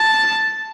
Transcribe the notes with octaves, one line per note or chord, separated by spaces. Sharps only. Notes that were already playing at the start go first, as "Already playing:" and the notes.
Already playing: A5